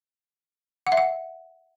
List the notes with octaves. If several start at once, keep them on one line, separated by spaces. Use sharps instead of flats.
F#5
E5
F#5